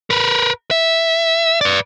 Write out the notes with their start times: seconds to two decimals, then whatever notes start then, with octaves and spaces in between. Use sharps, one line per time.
0.10 A#4 B4
0.71 E5
1.61 B4 D5